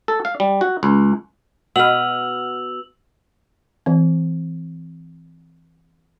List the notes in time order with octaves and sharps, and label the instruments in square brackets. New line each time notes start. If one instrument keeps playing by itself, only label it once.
[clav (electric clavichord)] A4
F5
G3
F#4
C#2
[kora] B2 B4 [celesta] F#5 F6 [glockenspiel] E6 F7 F#7
[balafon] E3 C4